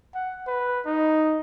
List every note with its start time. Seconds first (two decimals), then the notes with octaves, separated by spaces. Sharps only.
0.15 F#5
0.47 B4
0.86 D#4